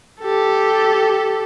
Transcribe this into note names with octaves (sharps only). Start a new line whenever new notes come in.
G4 A4